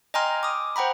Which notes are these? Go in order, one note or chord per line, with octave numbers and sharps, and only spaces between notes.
D#5 G5 G#5 A#5 C6 F6
D6 D#6
C5 F#5 G5 A#5 B5